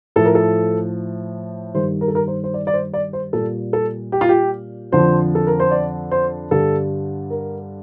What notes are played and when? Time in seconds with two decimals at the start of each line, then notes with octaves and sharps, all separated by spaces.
0.16 A2 F3 A4
0.25 A#4
0.35 A4
1.74 G2 D#3 G3 C5
2.01 A#4
2.08 A4
2.15 A#4
2.27 C5
2.44 C5
2.54 D5
2.67 D5
2.73 C5
2.94 D5
3.13 C5
3.33 A#2 G3 A4
3.73 A4
4.12 G4
4.21 F4
4.29 G4
4.92 F2 D3 F3 C5
5.35 A4
5.47 A#4
5.60 C5
5.71 D5
6.11 C5
6.51 G2 D3 G3 A4
7.30 A#4